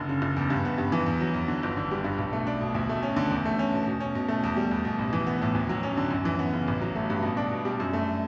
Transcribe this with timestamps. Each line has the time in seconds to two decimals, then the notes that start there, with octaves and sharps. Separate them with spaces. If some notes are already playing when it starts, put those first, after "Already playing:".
Already playing: F#1 D3
0.09 C#3
0.22 F#1
0.36 E2
0.50 G2
0.65 B3
0.78 G2
0.92 E3
1.06 E2
1.20 F#3
1.34 E2
1.48 D3
1.63 G1
1.77 D3
1.91 G3
2.04 G2
2.18 B1
2.33 A3
2.47 D4
2.61 B2
2.75 D2
2.89 A3
3.03 C#4
3.16 D3
3.30 E2
3.45 A3
3.59 C#4
3.73 B2
3.87 B2
4.00 C#4
4.15 B2
4.28 A3
4.44 E2
4.56 G3
4.71 E2
4.85 B2
4.99 A1
5.13 E3
5.26 B3
5.42 A2
5.55 D2
5.69 F#3
5.83 C#4
5.97 D3
6.11 F#2
6.25 E3
6.39 B3
6.53 C#3
6.68 A1
6.81 F#3
6.96 A3
7.10 G2
7.23 B2
7.37 D4
7.51 B2
7.65 G3
7.80 F#2
7.93 A3